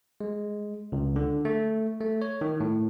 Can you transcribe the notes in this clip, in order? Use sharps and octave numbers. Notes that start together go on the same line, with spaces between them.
G#3
C#2
D3
A3
A3
C#5
D#3
A2